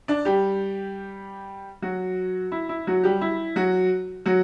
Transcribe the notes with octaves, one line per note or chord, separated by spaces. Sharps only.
D4 D5
G3 G4
F#3 F#4
E4
E4
F#3 F#4
G3 G4
E4
F#3 F#4
F#3 F#4